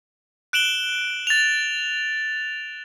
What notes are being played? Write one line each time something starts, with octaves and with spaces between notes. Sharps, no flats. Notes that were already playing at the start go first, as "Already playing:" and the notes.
F#6 D7 E7 F#7 G7
A6 F7